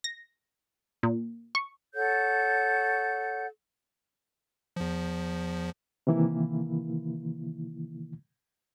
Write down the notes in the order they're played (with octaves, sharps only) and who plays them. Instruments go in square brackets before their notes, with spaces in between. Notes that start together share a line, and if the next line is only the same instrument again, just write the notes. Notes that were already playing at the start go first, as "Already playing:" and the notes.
[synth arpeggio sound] A#6
A#2
C#6
[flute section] A4 C#5 F#5 G6
[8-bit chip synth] E2 F3
[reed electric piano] C3 D#3 E3 A#3 E4